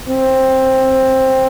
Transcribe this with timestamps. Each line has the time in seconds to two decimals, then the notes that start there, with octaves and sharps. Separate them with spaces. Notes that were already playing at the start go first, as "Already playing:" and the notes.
0.09 C4